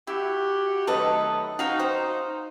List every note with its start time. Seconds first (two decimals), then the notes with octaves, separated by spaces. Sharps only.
0.07 E4 F#4 G4
0.87 D#3 F#3 A3 A4 B4 D#5
1.59 D#4 F#4 F5 G5
1.80 C5